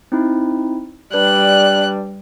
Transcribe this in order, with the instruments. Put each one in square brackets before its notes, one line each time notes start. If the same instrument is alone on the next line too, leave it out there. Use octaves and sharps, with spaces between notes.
[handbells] C4 D#4 E4
[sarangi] G3 [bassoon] D4 [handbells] B4 [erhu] F#6